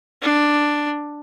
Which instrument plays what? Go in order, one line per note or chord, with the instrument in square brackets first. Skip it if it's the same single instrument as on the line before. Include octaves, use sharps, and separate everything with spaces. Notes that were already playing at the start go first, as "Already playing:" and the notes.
[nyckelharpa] D4